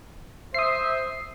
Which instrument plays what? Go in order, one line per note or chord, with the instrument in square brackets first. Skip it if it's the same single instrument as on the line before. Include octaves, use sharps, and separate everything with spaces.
[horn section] C5 E5 [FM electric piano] D#6 C7